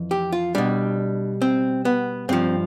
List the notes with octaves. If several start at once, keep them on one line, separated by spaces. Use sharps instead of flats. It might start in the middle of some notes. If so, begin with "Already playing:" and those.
Already playing: F2 E3
G4
F4
B2 G3 D4
C4
B3
G2 F3 C4